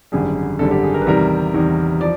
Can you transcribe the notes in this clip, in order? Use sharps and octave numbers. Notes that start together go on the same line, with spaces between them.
G#1 F#2 D3 G3 G#4
G#1 F#2 D3 G3 A4
G4
G#4
A#4
B4
E2 C3 D#3 G3 A#4
E2 C3 D#3 G3
F3 D5